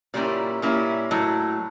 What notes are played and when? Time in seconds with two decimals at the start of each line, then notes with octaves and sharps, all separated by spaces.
0.14 A#2 G3 A#3 C#4 E4 D5
0.62 A#2 G3 A#3 C#4 E4
1.11 A2 F#3